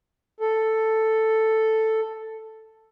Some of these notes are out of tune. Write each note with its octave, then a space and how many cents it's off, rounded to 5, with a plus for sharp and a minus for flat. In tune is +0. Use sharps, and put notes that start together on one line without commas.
A4 +5